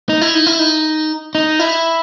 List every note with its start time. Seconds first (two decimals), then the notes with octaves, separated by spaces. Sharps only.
0.09 D#4
0.21 E4
0.35 D#4
0.47 E4
0.59 D#4
1.35 D#4
1.60 E4